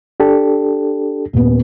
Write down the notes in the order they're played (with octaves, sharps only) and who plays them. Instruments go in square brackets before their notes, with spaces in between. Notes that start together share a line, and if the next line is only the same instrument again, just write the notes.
[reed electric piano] D4 G4 A4
[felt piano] D#1 B3